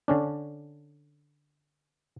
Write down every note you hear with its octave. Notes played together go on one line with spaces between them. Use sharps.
D3 C#4 D4